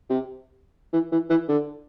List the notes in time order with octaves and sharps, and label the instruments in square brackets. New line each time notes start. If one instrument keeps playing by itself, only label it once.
[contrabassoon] C3
E3
E3
E3
D3